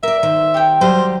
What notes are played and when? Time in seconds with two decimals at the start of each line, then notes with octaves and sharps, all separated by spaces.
0.03 A#4 D5 E5
0.23 D#3 C5
0.54 G4 G5
0.81 F#3 G3 C5